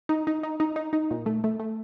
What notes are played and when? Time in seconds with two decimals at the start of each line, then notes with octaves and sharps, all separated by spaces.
0.09 D#4
0.27 D#4
0.43 D#4
0.60 D#4
0.76 D#4
0.93 D#4
1.11 A#2
1.26 A3
1.44 A3
1.60 A3